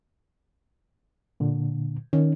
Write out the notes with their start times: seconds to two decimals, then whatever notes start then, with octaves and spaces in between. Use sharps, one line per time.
1.40 A#2 D3
2.13 D#3 C#4